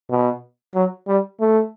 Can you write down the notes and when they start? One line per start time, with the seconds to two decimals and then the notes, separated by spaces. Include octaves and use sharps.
0.10 B2
0.75 F#3
1.08 G3
1.40 A3